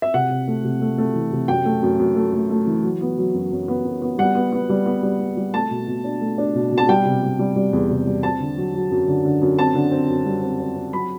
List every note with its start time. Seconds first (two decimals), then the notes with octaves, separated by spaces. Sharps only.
0.02 E5
0.14 C3 F#5
0.31 C3
0.48 A3
0.64 C3
0.82 A3
0.98 A3
1.15 E3
1.32 C3
1.48 F#2 G5
1.65 A3
1.83 F#2
1.99 F#2
2.16 A3
2.33 A3
2.50 A3
2.67 E3
2.84 F#3
3.01 B3
3.17 F#3
3.34 F#2
3.52 F#2
3.68 B3
3.85 F#2
4.02 B3
4.18 G3 F#5
4.35 B3
4.52 B3
4.69 G3
4.86 B3
5.03 G3
5.20 B3
5.37 G3
5.54 A3 A5
5.71 B2
5.87 B2
6.04 D4
6.21 A3
6.38 D4
6.55 B2
6.71 B2
6.78 A5
6.89 G3 G5
7.05 C3
7.23 G3
7.39 G3
7.56 G3
7.73 E2
7.90 C3
8.07 G3
8.23 C4 A5
8.40 D3
8.57 F#3
8.74 F#3
8.91 F#2
9.08 D3
9.25 D3
9.42 F#2
9.59 C4 A5
9.75 D3
9.92 C4
10.09 F#2
10.26 G3
10.43 C4
10.60 C4
10.76 C4
10.93 F#3 B5